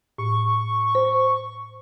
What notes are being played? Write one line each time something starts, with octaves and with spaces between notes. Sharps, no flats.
A2 C#6
C5